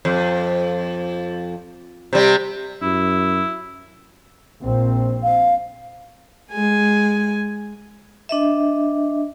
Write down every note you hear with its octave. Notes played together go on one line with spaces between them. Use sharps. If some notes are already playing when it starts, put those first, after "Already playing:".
F2
C3 G3
F#2 E4
A#1 A#2 C4
F5
G#3 G#5
D4 D#5 E5